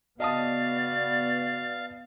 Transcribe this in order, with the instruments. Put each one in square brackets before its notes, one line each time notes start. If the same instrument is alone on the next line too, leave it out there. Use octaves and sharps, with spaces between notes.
[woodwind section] C#3 F#4 D5 [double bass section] B3 [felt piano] D#5 A5 D#6 [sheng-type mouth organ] F5